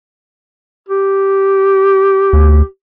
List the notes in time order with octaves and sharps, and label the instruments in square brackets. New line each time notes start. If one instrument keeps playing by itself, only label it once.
[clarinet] G4
[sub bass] D2